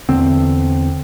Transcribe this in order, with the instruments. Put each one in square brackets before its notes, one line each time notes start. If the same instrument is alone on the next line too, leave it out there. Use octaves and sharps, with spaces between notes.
[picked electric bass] E2 D3 C4